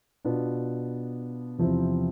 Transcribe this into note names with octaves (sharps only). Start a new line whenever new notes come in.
B2 B3 D4 F4
E2 C3 F3 C4 E4